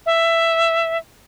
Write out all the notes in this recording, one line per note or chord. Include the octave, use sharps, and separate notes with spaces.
E5